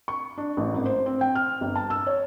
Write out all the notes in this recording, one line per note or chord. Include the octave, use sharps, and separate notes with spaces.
C#6
D4
A1
G#1
C5
C4
G5
F6
G1
A5
E6
C#5